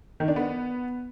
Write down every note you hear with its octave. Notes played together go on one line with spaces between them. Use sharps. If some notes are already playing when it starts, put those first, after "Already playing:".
D#3
D4
B3